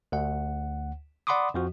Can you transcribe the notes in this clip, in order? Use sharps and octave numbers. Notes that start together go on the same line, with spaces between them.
D2 F#5
D5 F#5 B5 C6 D6 D#6
F2 F3 F#4